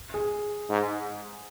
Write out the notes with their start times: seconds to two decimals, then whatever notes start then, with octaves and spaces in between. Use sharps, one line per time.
0.14 G#4
0.69 G#2